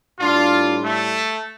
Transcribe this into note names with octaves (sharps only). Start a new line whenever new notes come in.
A2 G3 D4 F4
A3